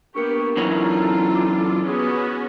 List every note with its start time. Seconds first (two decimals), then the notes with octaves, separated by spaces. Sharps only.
0.15 A#3 B3 D4 G4 A#4 C#6 C#7
0.57 F#2 E3 D#4 F4 A4 C#5
1.35 D6
1.85 B3 C#4 F#4 G#4